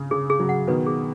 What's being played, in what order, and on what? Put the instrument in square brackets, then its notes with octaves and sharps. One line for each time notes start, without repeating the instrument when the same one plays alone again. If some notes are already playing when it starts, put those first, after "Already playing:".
Already playing: [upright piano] C#3
[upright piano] C#3 [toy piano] G#4
[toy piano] G#4
[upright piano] C#3 F#3
[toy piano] F#5
[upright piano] B2 D#3 [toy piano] B4
[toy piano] G#4